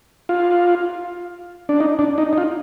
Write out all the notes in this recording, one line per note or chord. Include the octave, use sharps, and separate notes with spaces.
F4
D4
D#4
D4
D#4
D#4
F4